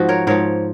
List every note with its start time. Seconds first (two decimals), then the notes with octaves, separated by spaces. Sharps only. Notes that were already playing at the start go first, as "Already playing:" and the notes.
Already playing: G#2 F3 F#4
0.09 A#4 C#5
0.27 G#2 F3 A#4 C#5